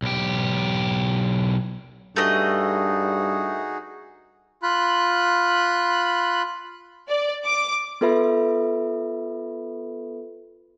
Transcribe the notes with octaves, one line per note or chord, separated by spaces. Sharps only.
B1 G4
G2 A3 D#4 F#4 G#4 D#5
F4 B5 F#6
D5
D6
B3 F4 A4 B4 E5 B5